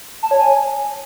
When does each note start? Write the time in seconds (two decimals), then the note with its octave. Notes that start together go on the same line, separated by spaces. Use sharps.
0.23 A5
0.31 C#5
0.39 G#5